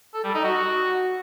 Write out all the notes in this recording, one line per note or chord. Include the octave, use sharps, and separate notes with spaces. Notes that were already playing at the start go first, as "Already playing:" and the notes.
A4
G3
D#4
F#4